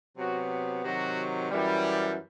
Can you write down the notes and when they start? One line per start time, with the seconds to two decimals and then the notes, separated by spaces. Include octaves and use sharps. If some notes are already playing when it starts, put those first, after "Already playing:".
0.18 C3 F#3 B3 F#4
0.83 C3 D#3 F#3 F#4
1.50 F#2 E3 G3